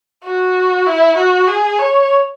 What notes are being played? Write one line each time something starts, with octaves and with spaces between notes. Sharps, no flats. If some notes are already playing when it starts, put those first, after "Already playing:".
F#4
E4
F#4
G#4
C#5